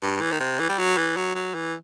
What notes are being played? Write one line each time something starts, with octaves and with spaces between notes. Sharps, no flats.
G2
E3
D#3
C3
E3
G3
F#3
E3
F#3
F#3
E3